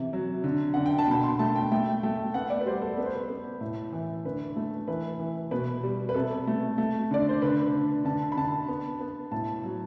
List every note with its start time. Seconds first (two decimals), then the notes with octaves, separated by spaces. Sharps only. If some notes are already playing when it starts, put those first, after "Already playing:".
Already playing: C3 E3
0.13 F#3
0.44 D3
0.74 D3 F#5
0.86 G5
0.99 A5
1.07 B2 B5
1.23 C6
1.39 A3 A5
1.56 G5
1.72 A3 G5
2.03 A3
2.14 G5
2.34 B3 F#5
2.50 D5
2.61 B4
2.66 G3 C5
2.82 A4
2.97 B3 B4
3.06 C5
3.15 B4
3.29 B3
3.61 A2
3.92 E3
4.25 D3 B4
4.56 A3
4.88 E3 B4
5.19 E3
5.51 B2 B4
5.83 G3
6.09 B4
6.14 C3 A4
6.47 A3
6.78 A3
7.11 D3 D5
7.29 C5
7.42 D3 B4
7.74 D3
8.05 D3 A5
8.32 B5
8.37 D3 A5
8.69 B3
9.00 B3
9.32 A2 A5
9.63 F#3